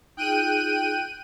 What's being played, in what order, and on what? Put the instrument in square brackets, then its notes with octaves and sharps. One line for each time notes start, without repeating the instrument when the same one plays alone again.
[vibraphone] D#4 F4 G#4 [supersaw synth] G5 F#6 D#7